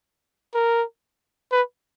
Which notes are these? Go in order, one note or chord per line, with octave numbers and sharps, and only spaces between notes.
A#4
B4